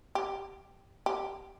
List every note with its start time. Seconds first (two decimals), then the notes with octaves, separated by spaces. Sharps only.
0.15 G4
1.06 G4